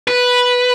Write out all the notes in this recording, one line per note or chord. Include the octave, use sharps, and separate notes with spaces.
B4